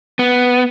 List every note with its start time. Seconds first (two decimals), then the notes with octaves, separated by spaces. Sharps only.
0.19 B3